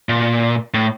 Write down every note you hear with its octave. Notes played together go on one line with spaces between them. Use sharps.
A#2
A2